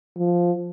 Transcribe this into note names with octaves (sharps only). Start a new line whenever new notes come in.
F3